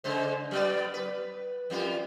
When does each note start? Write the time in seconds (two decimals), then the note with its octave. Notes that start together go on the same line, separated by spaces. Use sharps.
0.04 C#3 G#3 C5
0.51 F#3 B3 D5
0.94 B4
1.70 F2 G3 F4